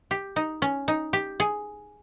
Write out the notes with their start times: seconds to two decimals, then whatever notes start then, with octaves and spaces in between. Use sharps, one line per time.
0.11 G4
0.36 D#4
0.62 C#4
0.88 D#4
1.13 G4
1.40 G#4